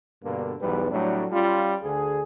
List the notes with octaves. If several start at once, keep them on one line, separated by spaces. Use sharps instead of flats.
G2 B2 D3 A#3
B1 E2 G#2 G3 B4
A2 F#3 G3 A3 D4
G3 C#4 F4
D2 D3 G#4